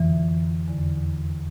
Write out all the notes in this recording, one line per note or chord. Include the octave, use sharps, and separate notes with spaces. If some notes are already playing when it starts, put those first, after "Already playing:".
Already playing: F2 D3 E3
E2 D3